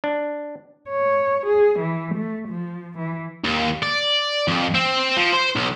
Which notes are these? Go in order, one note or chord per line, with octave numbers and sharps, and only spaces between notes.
D4
C#5
G#4
E3
A3
F3
E3
D#2
D5
F2
C4
F3
C5
B1